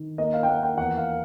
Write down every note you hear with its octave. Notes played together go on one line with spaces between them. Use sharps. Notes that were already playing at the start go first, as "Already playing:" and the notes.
Already playing: D#3
A#3 D#5
F5
G5
A#3 F#5
G5
E2 F#5
F5